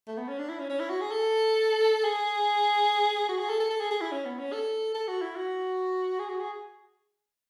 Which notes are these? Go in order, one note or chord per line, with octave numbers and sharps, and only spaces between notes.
A3
B3
C#4
D4
E4
C#4
C#4
E4
F#4
G#4
A4
G#4
F#4
G#4
A4
A4
A4
G#4
G#4
E4
C#4
B3
C#4
A4
A4
F#4
E4
F#4
G#4
F#4
G#4